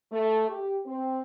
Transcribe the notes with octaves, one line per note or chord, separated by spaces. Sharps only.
A3
G4
C4